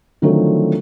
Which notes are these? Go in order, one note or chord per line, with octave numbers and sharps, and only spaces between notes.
D3 D#3 F3 F#3 A3 C4